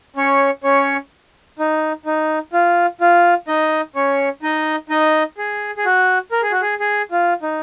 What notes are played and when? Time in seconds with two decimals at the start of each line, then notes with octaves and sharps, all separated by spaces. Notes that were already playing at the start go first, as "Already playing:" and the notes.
0.16 C#4 C#5
0.64 C#4 C#5
1.59 D#4
2.06 D#4
2.53 F4
3.01 F4
3.48 D#4 D#5
3.96 C#4 C#5
4.43 D#4 D#5
4.90 D#4 D#5
5.38 G#4
5.77 G#4
5.85 F#4
6.32 A#4
6.42 G#4
6.52 F#4
6.62 G#4
6.80 G#4
7.12 F4
7.42 D#4